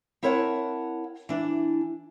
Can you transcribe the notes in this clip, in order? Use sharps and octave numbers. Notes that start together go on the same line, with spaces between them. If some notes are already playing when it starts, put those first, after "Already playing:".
C4 E4 A#4 C#5 F#5 A5
E3 D4